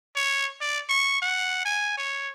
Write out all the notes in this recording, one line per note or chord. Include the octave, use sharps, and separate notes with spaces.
C#5
D5
C#6
F#5
G#5
C#5